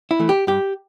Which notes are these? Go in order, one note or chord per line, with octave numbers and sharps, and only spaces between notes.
E4
E3 A3
G4
G2 G4